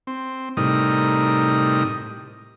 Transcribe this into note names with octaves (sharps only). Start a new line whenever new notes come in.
C4
A2 C3 G3 D#4 A#4 D#6